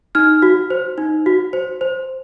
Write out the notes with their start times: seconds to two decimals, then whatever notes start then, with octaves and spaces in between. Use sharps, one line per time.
0.15 D#4 F6
0.42 F#4
0.70 C5
0.98 D#4
1.26 F#4
1.53 C5
1.81 C5